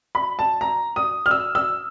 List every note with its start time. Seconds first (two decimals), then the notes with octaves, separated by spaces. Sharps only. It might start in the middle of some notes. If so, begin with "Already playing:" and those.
0.15 B5
0.39 A5
0.61 A#5
0.96 D#6
1.26 F6
1.31 E6
1.55 E6